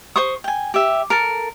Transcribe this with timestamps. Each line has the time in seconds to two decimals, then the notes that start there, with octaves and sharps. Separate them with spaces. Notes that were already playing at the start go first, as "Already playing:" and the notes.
0.16 C5 C6 C#6 D#6
0.44 G5 G#5
0.74 G4 E5
1.10 A4 A#4